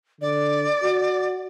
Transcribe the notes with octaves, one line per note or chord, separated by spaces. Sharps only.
D3 D5
F#4